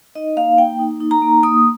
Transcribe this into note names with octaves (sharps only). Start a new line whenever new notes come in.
D#4 D#5
A#3 F5
A#3 G5
D#4
D#4
A#5
A#3
A#3 D#6